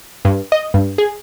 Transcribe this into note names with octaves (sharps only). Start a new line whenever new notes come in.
G2
D#5
G2
G#4